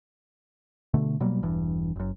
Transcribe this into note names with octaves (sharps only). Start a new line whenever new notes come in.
B2 D3 A3
B2 F#3 G3 A#3
E1 G2 E3
F#1 F#2